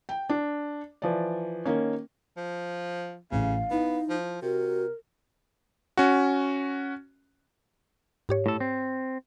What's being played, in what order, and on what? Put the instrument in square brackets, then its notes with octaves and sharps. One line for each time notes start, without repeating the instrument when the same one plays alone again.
[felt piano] G5
D4
E3 F3 D5
D#3 A#3 C#4
[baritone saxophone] F3
[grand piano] A1 [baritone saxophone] C#3 [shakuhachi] F5
[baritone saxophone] B3 [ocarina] D#4 [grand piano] E4
[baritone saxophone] F3
[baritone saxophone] C3 [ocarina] F#4 [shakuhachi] A#4
[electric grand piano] C#4 F#4
[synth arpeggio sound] G#2 G4 C#5
[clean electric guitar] A2 A4
C4